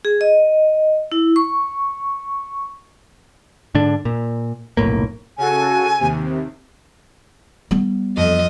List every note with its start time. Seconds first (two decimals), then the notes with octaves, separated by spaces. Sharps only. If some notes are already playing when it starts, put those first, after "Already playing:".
0.05 G#4
0.21 D#5
1.12 E4
1.36 C#6
3.75 G#2 D3 D4
4.05 A#2
4.77 F1 B1 A2 A#3
5.38 C#3 F#4 A4 G#5
5.99 D#2 C3
7.71 G3 B3
8.17 F2 D#5